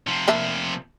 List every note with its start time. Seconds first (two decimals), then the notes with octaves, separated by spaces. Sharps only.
0.07 C3 F3
0.28 A#3 D4 E5